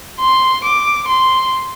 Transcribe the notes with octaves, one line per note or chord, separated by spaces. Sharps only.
C6
D6
C6